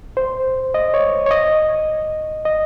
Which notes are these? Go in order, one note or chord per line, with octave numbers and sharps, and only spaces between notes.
C5
D#5
C#5
C#5
D#5
D#5